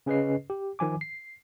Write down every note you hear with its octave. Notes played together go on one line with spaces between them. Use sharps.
C#3 C#4 G#4 B4 D#5 C7
G4
D#3 F3 G#5 D6
C7